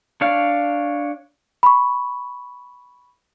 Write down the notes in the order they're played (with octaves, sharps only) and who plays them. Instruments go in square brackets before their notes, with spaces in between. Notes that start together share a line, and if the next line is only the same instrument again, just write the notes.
[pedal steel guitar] D4 C#5 D5 F5
[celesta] B5 C#6